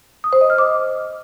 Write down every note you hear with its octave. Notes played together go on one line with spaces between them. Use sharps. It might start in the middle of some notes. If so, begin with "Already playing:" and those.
D#6
C5
D#5
F6
D6